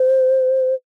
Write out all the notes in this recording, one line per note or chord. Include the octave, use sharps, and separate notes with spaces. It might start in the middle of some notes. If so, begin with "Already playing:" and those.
Already playing: C5